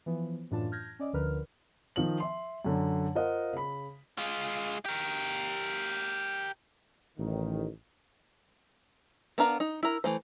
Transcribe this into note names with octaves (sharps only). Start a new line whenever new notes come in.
E3 F3 B3
F#2 A2 E3 D4 F4 A5
F6 G6 G#6 A#6
C#4 D5 D#5
D2 D3 F3 A#4 B4 F6
D#3 F3 F#7
E5 C6
F#2 D3
F4 A#4 C5 D#5 F5 F#5
C#3 B5
G#3 F4
G4 A#4
A1 D#3
B3 D4 A#4 F5
D#4
E4 A#4
E3 A3 C5